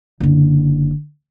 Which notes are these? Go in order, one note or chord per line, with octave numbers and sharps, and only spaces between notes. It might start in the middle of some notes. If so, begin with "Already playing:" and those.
F#1 D3